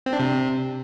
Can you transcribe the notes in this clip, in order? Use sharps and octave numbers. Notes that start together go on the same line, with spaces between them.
C4
D4
C3